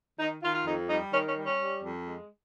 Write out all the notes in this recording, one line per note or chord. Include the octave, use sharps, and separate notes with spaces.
D#3 D#4
D#3 F4
F4
F2 D#4
G3 D#4
D#3 C#4
C#4
G3
C#4
G3
F2
G#3